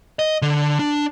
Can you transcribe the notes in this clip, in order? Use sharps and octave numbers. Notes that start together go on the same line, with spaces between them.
D#5
D3
D4